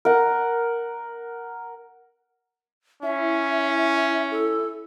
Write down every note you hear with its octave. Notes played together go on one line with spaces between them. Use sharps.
A#4 F#5
C#4 E4 E5
A4